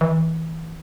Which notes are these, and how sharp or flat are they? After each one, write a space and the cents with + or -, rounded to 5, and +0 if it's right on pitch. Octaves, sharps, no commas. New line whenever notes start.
E3 -25